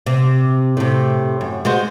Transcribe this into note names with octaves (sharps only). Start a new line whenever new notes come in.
C3
A2 C3
F#2
G#3 F#4 C5